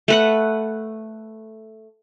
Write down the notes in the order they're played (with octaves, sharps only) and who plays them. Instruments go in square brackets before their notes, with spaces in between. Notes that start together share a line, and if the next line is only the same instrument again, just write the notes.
[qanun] A3 B4 F#5